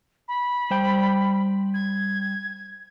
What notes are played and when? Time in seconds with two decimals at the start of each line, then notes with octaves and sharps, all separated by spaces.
0.28 B5
0.70 G3 C5 G5
1.74 G#6